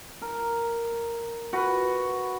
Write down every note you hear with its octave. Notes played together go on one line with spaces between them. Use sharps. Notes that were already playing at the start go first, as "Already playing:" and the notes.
A#4
F#4 B4